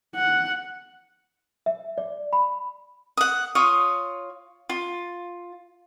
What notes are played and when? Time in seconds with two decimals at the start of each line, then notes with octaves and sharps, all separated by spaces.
0.15 F#5
1.66 E5
1.98 D5
2.33 B5
3.17 F#5 D#6
3.55 F4 C#5 D#6
4.69 F4